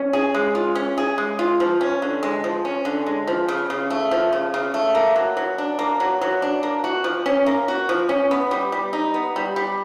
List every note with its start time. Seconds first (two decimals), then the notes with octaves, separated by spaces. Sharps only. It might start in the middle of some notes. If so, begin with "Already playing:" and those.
Already playing: C#4
0.13 G#4
0.34 G#3
0.55 F4
0.75 C#4
0.98 G#4
1.18 G#3
1.39 F4
1.60 F3
1.81 C#4
2.02 D3
2.23 G#3
2.44 F3
2.65 C#4
2.85 D3
3.06 G#3
3.27 F3
3.48 C#3
3.70 C#3
3.90 A3
4.11 F3
4.33 C#3
4.54 C#3
4.74 A3
4.95 A#3
5.16 F#3
5.37 F#3
5.58 D4
5.79 A#3
6.00 F#3
6.21 F#3
6.42 D4
6.63 A#3
6.84 F#4
7.04 F3
7.26 C#4
7.46 A#3
7.68 F#4
7.89 F3
8.09 C#4
8.31 B3
8.51 G3
8.72 G3
8.93 D#4
9.14 B3
9.36 G3
9.56 G3